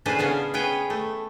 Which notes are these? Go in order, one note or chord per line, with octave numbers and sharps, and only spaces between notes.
A2 C#4 D4 G#4 B4 C5
C#3 B3 C#4 F5
B3 G#4 B4 C#5 G5
A3